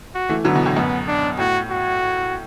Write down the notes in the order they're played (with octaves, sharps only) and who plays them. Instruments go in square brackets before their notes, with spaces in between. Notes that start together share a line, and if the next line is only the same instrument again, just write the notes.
[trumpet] F#4
[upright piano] E3 A3
[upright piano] D3 F#3 [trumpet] B3
[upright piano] B2 E3
A2 D3
[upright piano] F#2 B2 [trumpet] B3
[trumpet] D4
[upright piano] A2 [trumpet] F#4
[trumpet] F#4